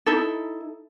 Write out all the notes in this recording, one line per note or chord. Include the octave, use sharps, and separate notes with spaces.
D#4 E4 A4